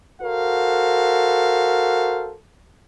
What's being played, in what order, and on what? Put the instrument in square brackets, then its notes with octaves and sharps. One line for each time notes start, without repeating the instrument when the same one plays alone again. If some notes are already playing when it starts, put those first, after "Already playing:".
[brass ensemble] F#4 A4 A#4 C5 F5